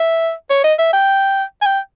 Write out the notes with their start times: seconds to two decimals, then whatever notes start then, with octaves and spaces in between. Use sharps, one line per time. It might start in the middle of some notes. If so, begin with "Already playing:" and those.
Already playing: E5
0.50 C#5
0.64 D#5
0.79 E5
0.93 G5
1.62 G#5
1.66 G5